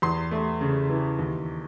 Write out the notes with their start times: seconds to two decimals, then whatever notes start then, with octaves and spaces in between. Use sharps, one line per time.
0.02 E2 C6
0.31 A3
0.61 C#3
0.89 E3
1.19 D#2